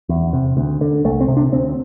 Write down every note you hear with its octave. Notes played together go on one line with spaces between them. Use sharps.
E2
C3
D2
D3
C2 A3
C4
C3
D4
D2 C4